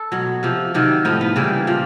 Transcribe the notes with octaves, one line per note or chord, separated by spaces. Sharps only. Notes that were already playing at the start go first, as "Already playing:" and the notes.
Already playing: A4
B2 F#3
C3 F3
C3 D#3 F#3
A2 F3 D#4
B3
C#3 E3 G3 A#3
A#2 F3